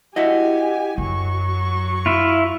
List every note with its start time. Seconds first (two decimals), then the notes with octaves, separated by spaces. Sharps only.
0.16 E4 F#4 G4 D#5 G#5
0.98 F#2 F#3 C#6
2.06 E4 F4